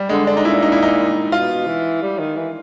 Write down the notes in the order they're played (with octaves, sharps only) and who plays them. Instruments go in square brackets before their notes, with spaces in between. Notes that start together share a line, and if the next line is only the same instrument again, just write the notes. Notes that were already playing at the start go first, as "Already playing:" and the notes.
Already playing: [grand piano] G3
[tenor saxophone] D3 [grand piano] G#3
[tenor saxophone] D3 [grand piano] D4
[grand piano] D#4
[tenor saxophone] A#2 [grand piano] E4
[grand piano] D#4
E4
D#4
[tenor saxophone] B2 [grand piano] F4
[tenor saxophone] E3
G3
D#3
E3